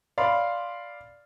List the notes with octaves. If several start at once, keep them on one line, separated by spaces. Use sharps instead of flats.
D5 F5 B5 C6